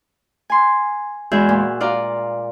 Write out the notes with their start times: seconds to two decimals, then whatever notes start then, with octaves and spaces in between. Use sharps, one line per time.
0.50 G#5 C6
1.32 E2 G#3 F#4 G#4 E5 G6
1.49 A#2
1.81 F4 D5 F5 A#5